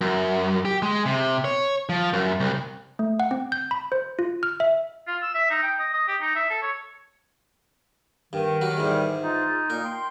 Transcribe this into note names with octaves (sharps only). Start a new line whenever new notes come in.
F#2
G4
G#3
C3
C#5
F3
F#2
C2
A3
F#5
C4
G6
B5
C5
F4
F6
E5
F4
E6
E5
D#4
G5
D#5
D#5
G4
D#4
E5
A4
C#5
G2 D#3
F#3 G3 F#4
G#2 E3 G3 G#3
D#4 F4
A#2 A#3 A#4
G5 C6